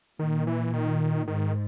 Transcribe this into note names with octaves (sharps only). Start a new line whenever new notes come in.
A#2 D#3
E3
D#3
G#2 D#3